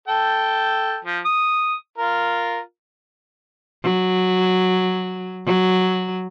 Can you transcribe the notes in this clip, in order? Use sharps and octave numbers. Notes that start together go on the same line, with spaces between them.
A4 G5 A5
F3
D#6
F4 A#4
F#3
F#3